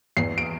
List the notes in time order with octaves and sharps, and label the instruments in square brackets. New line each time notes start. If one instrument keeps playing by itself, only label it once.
[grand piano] E2 C7
D7